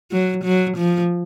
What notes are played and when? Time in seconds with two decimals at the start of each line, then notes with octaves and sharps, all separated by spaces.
0.11 F#3
0.44 F#3
0.77 F3